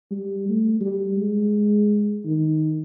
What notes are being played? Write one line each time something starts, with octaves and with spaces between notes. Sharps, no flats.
G3
A3
G3
G#3
D#3